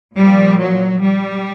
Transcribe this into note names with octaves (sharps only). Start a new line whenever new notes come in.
A#2 F3 G3
F#3
G3